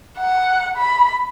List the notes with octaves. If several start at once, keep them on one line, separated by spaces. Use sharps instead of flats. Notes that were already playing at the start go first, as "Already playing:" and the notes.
F#5
B5